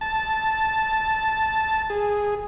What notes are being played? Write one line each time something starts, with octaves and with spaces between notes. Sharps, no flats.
A5
G#4